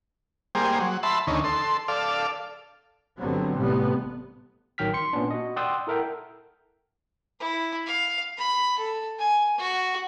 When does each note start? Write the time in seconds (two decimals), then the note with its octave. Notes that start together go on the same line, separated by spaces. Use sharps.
0.55 G3 A#3 G#4 C5
0.80 F#3
1.03 E5 A5 B5 C6
1.27 D2 D#3 C#4
1.44 A4 C6
1.88 A4 D5 F5
3.17 G1 D3 F#3 G3 B3 C4
3.56 A1 A2 C3 G3 B3
4.78 A1 D#3 F#3 G5 F6 B6
4.94 C6 C#7
5.13 A#2 B3 C#4 D4
5.31 F#4 D#5
5.56 D5 F#5 G5 C6 D#6 E6
5.87 E4 A4 A#4 E5 F#5 G5
7.40 E4
7.86 F5
8.38 B5
8.78 A4
9.19 G#5
9.58 F#4